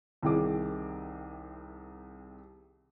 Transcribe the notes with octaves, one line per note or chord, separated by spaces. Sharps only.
C2 C3 D#3 G#4 D6